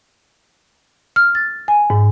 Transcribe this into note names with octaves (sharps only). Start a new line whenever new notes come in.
F6
A6
G#5
G#2